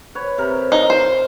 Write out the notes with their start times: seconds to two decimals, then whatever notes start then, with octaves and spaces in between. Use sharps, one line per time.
0.15 B4 C#5
0.38 C3 A#4
0.72 D#4
0.90 C5